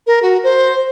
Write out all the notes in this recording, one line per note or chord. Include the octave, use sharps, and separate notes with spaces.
A#4
F#4
C5